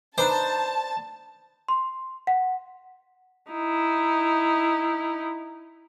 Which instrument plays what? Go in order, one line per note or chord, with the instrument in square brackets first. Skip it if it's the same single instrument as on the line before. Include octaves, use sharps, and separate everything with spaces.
[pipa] D4 D#4 B4 [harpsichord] C5 [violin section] A5
[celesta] C6
F#5
[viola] D#4 E4